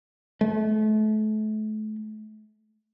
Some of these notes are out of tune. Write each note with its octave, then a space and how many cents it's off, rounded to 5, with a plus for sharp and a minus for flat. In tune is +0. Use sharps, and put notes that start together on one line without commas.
A3 -35